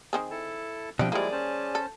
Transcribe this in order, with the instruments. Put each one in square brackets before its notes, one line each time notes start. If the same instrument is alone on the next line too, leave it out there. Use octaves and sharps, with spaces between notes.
[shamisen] D#3 C4 G#4
[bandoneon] E4 A4 A5
[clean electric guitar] B2 F3 [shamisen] G3 E4 [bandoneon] C4 D4 G5
[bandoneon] F3 G#3 E4 [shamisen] G3 A#3 [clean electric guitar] G#4 D5
[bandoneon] C#4 C5 A5
[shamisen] A4